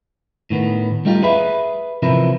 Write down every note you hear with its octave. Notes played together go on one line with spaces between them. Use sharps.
A2 D#3 B3
G3 A3 D#4 F4 G4
G#4 B4 E5 B5
C3 E3 F3 E4 A#4 B4